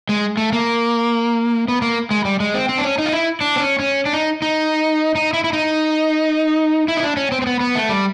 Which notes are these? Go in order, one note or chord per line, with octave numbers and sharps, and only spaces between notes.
G#3
A3
A#3
B3
A#3
G#3
G3
G#3
C4
C4
D4
C#4
D#4
F4
E4
D4
C4
C#4
C#4
D4
D#4
D#4
D#4
E4
E4
D#4
E4
D#4
D4
C#4
C4
C4
B3
B3
A3
G3